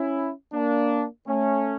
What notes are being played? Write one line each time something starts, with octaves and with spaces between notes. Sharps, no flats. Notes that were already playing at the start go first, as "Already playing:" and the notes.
Already playing: C#4 E4
A#3 D4
A3 C#4